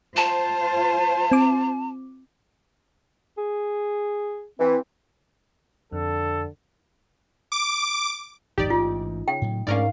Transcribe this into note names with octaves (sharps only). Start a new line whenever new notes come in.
F4 C5 A5
C4 D6
G#4
E3 C4
F2 D3 A4
D6
G#1 F2 D#4 G4 D5
A1 G#2 E3 F4
C#3 G5
A2 F#3
G#2 G#3 A3 C#4 D4 A#4 D5 F5